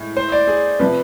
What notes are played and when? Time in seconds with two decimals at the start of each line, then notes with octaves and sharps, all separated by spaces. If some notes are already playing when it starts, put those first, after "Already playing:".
Already playing: A2 G#3
0.17 C5
0.32 D5
0.47 G#4
0.79 C3 F3 B4